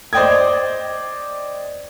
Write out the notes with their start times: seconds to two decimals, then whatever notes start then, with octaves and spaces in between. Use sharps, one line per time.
0.13 C5 D5 D#5 G5 D#6 G#6